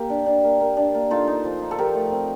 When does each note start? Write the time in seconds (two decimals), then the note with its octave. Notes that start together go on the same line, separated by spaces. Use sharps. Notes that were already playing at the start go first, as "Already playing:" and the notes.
Already playing: A#3 G4
0.10 D4
0.26 D4
0.44 A#3
0.61 A#3
0.77 D4
0.94 A#3
1.10 D#4 F4 A4
1.27 D#4
1.45 F3
1.62 D#4
1.71 A4
1.78 F3 G4 A#4
1.95 A3
2.12 C4